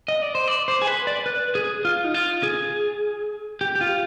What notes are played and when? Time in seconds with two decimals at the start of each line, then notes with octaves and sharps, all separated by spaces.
0.08 D#5
0.22 D5
0.35 C5
0.48 D5
0.68 C5
0.82 G#4
0.87 B4
1.07 D5
1.26 B4
1.55 G#4
1.85 F4
2.04 D#4
2.14 F4
2.43 G#4
3.61 G4
3.76 G4
3.81 F4